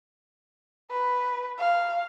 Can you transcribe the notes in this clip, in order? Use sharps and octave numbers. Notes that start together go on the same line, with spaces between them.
B4
F5